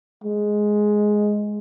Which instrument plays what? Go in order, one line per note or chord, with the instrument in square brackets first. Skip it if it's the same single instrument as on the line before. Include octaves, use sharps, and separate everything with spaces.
[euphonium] G#3